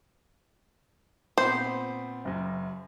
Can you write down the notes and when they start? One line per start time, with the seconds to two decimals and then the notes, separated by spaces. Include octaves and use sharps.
1.38 A#2 B3 C4 C5
2.25 F#1 F#2